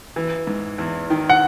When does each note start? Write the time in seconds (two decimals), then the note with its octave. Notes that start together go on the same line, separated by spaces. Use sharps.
0.16 E3
0.47 G#2
0.78 E2
1.10 D#3
1.30 F#5